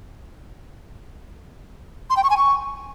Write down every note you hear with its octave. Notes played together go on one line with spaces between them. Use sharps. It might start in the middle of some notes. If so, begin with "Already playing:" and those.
C6
G5
C#6
G#5
C#6